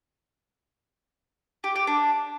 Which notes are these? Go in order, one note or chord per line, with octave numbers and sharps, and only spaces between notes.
G4
G4
D4